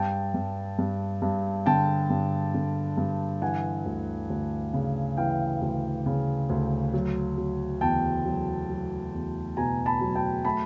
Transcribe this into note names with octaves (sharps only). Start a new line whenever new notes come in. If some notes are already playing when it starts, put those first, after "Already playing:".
Already playing: G2 G5 A5
G2
G2
G2
D3 G5 A5
G2
D3
G2
E3 F#5 G#5
D2
D2
C#3
E3 F5 G5
D2
C#3
D2
F#3
F#3
E2 G5 A5
F#3
F#3
E2
B2 G#5 A#5
A5 B5
F#3
G5 A5
A3 A5 B5